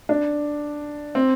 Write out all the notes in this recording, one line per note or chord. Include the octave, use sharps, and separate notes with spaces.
D4
C4